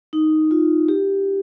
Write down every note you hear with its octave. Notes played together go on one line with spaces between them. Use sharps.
D#4
F4
G4